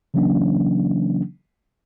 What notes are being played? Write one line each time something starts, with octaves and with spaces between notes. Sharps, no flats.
C#3 E3 F#3 A#3 C#4 D4